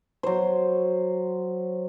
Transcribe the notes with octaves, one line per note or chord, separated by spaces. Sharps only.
F#3 C5